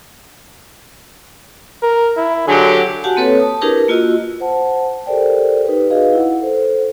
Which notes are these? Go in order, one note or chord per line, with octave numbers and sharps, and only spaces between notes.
A#4
E4
D3 F#3 G4 G#4
F#4 G4 F5 F#5 G#5 A5
A#3 C4 A4 B4 C#5
A5 D#6
D4 E4 G4 G#4 A#4 B4
A#3 F4 F#4 D#5 E6
C5 F#5 A5
G4 A4 A#4 C5 D5 G5
D#4 G4 B4
D#4 F#4 G#4 B4 D#5 F5
E4 F#5
A4 C5